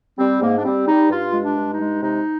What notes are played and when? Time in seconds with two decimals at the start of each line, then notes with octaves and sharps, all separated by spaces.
0.18 G3 C4
0.41 G#2 A#3
0.58 D4
0.65 G3 C4
0.87 G3 D#4
1.11 G2 F4
1.33 G#3
1.42 D4
1.58 G2
1.73 D#4
1.80 G#3
2.03 C3 D#4